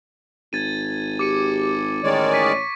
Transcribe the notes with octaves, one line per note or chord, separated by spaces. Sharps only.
G#1 G#6 A6 D#7
G4 D6 C#7 D#7
A1 D#3 G#3 C#5 D5
C#6 B6 D#7